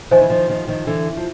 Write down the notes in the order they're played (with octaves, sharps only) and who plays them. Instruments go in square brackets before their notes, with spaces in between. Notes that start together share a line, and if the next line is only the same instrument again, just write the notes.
[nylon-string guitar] D#3 F3 [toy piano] C5 E5 G#5
[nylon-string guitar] E3
D#3 F3
D#3 F3
D#3 F3
D3 E3
F3